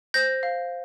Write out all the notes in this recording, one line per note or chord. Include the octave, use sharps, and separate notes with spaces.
C5 G6 A#6
F5